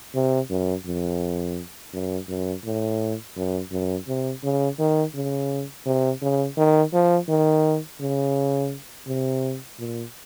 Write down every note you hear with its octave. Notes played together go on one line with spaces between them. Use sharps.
C3
F#2
F2
F#2
F#2
A2
F#2
F#2
C3
C#3
D#3
C#3
C3
C#3
D#3
F3
D#3
C#3
C3
A#2